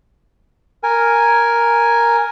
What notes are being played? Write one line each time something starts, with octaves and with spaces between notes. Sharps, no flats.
A#4 G#5